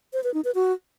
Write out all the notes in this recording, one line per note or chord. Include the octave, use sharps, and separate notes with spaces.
C5
B4
D#4
B4
F#4